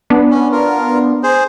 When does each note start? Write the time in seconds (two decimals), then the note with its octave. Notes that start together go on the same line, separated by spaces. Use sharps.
0.10 B3 D4
0.30 C#4
0.52 F4 A#4
1.23 G#4 C5